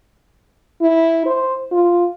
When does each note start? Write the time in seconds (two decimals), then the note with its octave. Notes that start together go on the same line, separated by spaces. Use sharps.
0.82 E4
1.26 C5
1.72 F4